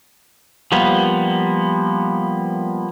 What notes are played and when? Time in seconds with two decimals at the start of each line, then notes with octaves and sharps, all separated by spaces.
0.72 F3 G3 A#3 B3